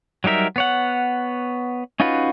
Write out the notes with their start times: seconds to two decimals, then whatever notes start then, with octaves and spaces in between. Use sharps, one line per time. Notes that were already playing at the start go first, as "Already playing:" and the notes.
0.24 F#3 G3 D#4 A#4 E5
0.56 B3 C#5 F#5
2.00 C#4 D#4 F4 F#4 B4